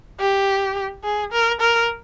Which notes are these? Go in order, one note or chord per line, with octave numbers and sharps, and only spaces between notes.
G4
G#4
A#4
A#4